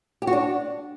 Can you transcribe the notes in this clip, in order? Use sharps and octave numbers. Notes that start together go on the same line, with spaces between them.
G4
F#4
D4